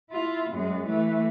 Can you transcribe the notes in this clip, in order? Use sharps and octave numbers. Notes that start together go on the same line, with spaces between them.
E4 F4
F#2 G#3
E3 A3